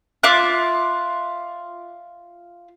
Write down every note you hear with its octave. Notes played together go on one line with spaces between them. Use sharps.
F4 E5 D6 F#6